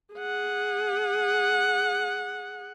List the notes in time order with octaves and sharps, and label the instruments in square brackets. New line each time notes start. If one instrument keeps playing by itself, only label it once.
[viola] G#4 F#5